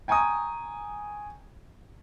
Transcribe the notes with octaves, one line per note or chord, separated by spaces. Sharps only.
G5 G#5 A#5 C#6 D#6